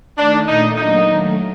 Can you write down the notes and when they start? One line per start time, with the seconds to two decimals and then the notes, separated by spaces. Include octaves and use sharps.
0.18 D#3 A3 D4 D#4
0.48 A#2 A3 D4 D#4
0.78 F#3 A#3 D4 D#4 F#4
1.09 D#3 F#3 A3